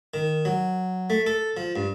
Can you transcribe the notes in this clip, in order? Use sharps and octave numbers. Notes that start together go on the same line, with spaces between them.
D#3
F#3
A3
A4
F3
G2